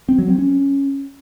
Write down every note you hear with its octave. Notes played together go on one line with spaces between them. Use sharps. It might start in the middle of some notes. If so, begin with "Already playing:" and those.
C4
F#3
C4
C#4